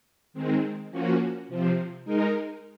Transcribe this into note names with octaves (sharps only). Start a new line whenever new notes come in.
D#3 G#3 C4
F3 A#3 C#4 F#4
C3 F3 C4
G#3 D#4 A#4